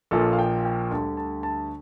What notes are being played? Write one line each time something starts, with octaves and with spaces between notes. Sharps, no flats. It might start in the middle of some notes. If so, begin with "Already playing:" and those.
A#1 A#2 F3 A4
F5
G5
G5
D2 D3 G3 A5
A5
A5